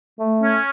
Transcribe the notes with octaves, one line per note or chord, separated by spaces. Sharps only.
A3
C#4